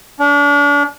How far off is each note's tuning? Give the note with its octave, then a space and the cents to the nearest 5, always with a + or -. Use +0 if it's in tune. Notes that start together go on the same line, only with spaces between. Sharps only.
D4 -35